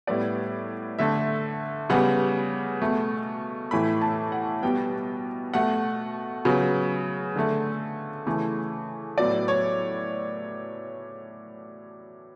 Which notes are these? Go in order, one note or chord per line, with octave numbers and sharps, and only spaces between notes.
A2 G3 B3 D5
D3 A3 E5
C#3 G3 B3 F#5
B2 A3
A2 E3 A3 B5
A5
F#5
B2 G3 B3 G5
B2 A3 F#5
C#3 F#3 B3
D3 A3
C#3 E3 A3
A2 F#3 B3 D5
C#5